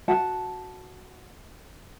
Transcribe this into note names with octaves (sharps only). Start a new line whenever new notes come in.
F#4 F#5 A5